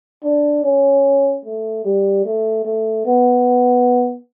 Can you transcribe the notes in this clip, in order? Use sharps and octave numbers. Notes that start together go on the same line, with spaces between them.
D4
C#4
A3
G3
A3
A3
B3